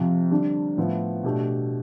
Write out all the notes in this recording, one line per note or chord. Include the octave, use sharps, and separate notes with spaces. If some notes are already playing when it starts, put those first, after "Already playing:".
Already playing: F2 C3 F3
D3 G3 D4
A2 F3 B3 E4
B2 A3 D4 G4